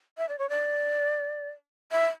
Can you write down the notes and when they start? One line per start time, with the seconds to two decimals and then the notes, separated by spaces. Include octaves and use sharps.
0.18 E5
0.29 D5
0.39 C#5
0.49 D5
1.91 E5